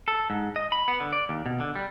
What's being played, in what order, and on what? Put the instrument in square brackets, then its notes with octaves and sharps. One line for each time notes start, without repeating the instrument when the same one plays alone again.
[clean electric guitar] A4
G#2
D#5
B5
B3
D3
D5
D#2
B2
D3
G3